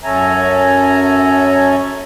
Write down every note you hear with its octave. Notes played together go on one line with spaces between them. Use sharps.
F#2 C#4 A4 E5 G#5 A#5